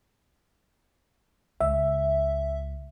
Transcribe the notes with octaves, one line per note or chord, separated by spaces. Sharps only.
C#2 E5